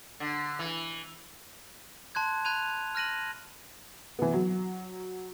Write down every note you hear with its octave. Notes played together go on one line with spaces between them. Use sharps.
D3
E3
A5 C6 F#6 G#6
B5 F#6 G#6 D#7 F7
F6 F#6 A#6 D#7 F#7
E3 B3
F#3